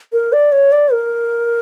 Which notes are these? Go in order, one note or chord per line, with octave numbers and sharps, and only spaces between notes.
A#4
D5
C#5
D5
A#4